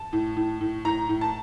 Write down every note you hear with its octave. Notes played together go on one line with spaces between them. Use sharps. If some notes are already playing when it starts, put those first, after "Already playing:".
Already playing: A5
A2
A2
A2
A2 A#5
A2
A5